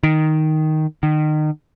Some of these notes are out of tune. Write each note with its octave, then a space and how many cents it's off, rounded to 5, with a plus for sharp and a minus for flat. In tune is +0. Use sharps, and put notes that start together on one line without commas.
D#3 +0
D#3 -30